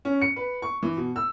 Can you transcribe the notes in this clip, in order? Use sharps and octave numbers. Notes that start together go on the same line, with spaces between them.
C#4
C#7
B4
C#6
E3
B2
E6